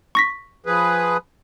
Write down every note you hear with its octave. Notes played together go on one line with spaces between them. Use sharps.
C#6 A#6 B6
F3 G#4 B4